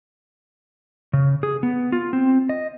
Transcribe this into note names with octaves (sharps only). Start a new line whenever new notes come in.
C#3
G#4
B3
F4
C4
D#5